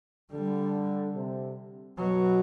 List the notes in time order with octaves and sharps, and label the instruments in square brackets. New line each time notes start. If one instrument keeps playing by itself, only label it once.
[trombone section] D3 [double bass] G3
[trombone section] C3
[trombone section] B2 [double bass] F#3